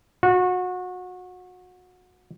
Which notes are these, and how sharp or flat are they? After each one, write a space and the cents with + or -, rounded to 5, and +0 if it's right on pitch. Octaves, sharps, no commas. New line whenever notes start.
F#4 -30